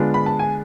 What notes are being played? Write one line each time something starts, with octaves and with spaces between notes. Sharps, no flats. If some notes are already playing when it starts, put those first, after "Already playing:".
Already playing: D3 G#3 B3 D4 F4
B5
A5
G#5